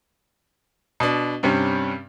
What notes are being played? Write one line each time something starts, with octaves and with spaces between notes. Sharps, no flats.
B2 D4
G2 C3 G3 C#4